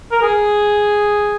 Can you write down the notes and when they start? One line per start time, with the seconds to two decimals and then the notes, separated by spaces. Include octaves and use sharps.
0.12 A#4
0.22 G#4